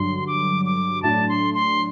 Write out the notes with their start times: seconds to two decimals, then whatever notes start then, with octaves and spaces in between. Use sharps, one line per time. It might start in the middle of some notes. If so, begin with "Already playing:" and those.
Already playing: G2 D3 F#3 C6
0.27 D6
0.65 D6
1.03 A2 F#3 A3 D4 A5
1.29 C6
1.54 C6